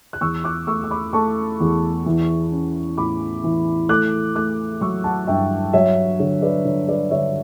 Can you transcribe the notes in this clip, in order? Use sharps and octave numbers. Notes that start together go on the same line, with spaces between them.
F#6
E2 C#6 E6
D6 F#6
A3 C#6 E6
E6
B5 D6
A3 A5 C#6
E2
E3
C#4
A2 B5 D6
E3
A3 D6 F#6
A3 D6 F#6
F#3 C#6 E6
F#5 A5
G2 E5 G5
F#3 C#5 E5
D3 C#5
B4 D5
D3 C#5
B4 D5
D3 C#5 E5